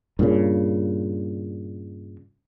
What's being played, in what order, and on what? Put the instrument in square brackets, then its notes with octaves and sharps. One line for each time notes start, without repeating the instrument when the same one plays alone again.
[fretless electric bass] G2 A#2 C#3